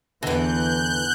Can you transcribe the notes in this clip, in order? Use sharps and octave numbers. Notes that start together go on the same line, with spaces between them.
E2 D3 E3 F#6 G6